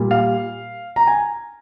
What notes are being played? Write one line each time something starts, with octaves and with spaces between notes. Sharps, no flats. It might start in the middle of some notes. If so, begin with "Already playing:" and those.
Already playing: A#2 G3
F5
A#5
G#5